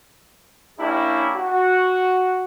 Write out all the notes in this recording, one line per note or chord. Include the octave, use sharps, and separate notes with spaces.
A#3 C#4 D4 E4 G4
F#4